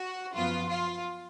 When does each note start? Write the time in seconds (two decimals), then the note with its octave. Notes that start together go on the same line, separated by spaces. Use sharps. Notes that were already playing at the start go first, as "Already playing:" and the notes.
Already playing: F#4
0.34 F#2 F3 B3 F4
0.68 F4